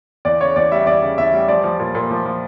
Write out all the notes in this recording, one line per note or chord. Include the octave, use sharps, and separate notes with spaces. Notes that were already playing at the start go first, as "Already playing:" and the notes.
E2 D5
C#3 C#5
E2 D5
G3 E5
E2 D5
C#3
E2 E5
G3
F3 D5
F3
A#2
A#2
F3
F3